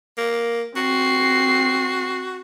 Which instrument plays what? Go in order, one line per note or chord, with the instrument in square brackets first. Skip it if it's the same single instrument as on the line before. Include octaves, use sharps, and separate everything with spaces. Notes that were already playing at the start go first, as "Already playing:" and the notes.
[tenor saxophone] A#3
[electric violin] C4 C7 [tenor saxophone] F#4